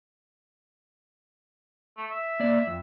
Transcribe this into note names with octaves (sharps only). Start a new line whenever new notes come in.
A3
E5
A#3 D5
F2